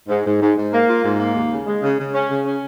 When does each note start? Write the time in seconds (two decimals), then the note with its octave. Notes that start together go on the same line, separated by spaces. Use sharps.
0.09 G#2
0.25 G#2
0.41 G#2
0.57 G#2
0.72 A#3
0.89 F4
1.04 G#2
1.20 A#3
1.35 D#2
1.51 C#3
1.67 G#3
1.82 C#3
1.99 C#3
2.15 C#4
2.30 C#3
2.46 C#4